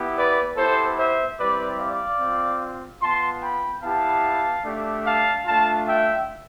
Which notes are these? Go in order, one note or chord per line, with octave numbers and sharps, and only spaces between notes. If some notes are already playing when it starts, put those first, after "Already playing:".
Already playing: B3 E4 G4
B4 D5
B3 E4 G4 A4 C5
C5 E5
G3 C4 E4 G4 B4 D5
D5 F5
C4 F4
B3 F4 A5 C6
G5 B5
B3 E4 G4 F5 A5
A3 D4 G4
F5 A5
A3 D4 F4 F5 A5
E5 G5